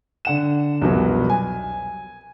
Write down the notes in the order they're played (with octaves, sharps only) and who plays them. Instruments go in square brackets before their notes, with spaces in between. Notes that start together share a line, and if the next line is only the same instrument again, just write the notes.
[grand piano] D3 F#5 E7
C2 F2 B2 F#3
G#5